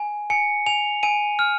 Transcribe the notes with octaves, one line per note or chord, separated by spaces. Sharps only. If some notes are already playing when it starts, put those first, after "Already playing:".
Already playing: G#5
G#5 C#7
G#5 F7
G#5 D#7
F6